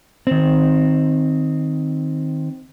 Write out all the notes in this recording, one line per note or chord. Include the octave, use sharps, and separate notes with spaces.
D#3 C4